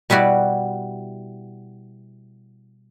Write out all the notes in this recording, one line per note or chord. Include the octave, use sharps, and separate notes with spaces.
B2 G3 E4 F#4 D5